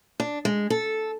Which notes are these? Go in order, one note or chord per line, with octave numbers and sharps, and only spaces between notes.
D4
G#3
A4